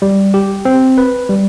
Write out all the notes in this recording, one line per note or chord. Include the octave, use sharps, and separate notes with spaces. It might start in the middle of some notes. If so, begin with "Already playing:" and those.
G3
G4
C4
B4
G3